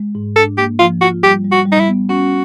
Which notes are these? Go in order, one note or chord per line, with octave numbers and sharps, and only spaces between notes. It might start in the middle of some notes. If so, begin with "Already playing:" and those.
Already playing: G#3
G#2
D4 A4
A#3 G4
F3 F4
F4 F#4
G3 G4
G3
F#4
G3
D#4
E4
B3
C#4 F#4